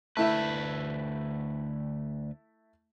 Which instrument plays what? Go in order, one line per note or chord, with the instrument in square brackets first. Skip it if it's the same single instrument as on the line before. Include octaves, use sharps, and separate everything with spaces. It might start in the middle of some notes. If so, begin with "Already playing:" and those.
[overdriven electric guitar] D2 B4 [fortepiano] A3 E4 E5